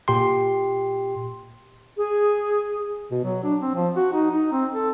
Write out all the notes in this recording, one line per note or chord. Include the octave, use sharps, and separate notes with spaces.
A#2 G4 G5 C6
G#4
B2
F#3
D4
C4
F3
F#4
D#4
D#4
C4
A4